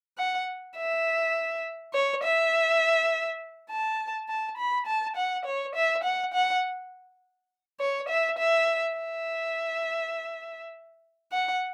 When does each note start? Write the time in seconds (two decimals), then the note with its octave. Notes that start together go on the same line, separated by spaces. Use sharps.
0.18 F#5
0.77 E5
1.93 C#5
2.23 E5
3.70 A5
4.29 A5
4.57 B5
4.87 A5
5.16 F#5
5.45 C#5
5.75 E5
6.04 F#5
6.34 F#5
7.80 C#5
8.09 E5
8.39 E5
8.97 E5
11.32 F#5